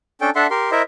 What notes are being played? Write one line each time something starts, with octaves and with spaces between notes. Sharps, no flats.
C#4 D4 A4 G5
D4 A4 E5 F#5 C6
G4 A#4 C6
E4 A#4 C5 D#5 E5